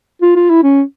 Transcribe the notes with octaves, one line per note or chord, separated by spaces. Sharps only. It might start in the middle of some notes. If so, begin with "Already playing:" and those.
F4
F4
E4
C#4